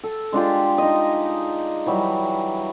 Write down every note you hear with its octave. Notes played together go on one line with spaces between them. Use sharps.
A4
G#3 D4 F4 G4
D#4 D#5
E3 F#3 G3